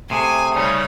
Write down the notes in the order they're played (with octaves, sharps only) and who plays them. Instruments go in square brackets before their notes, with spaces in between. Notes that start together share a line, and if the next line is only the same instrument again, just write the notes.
[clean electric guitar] C3 [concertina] A3 G#4 [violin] G#5
[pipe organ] C#3 G3 D#4 [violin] C#5